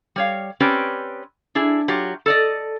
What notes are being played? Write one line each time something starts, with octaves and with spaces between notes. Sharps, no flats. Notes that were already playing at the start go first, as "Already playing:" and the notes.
G3 C#5 F5
C4 C#4 G4 B4 D5
D4 E4 G#4
F#3 F4 G4
A4 D5 D#5